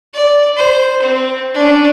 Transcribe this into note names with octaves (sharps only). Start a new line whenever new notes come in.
D5
C5
C4
C#4 D4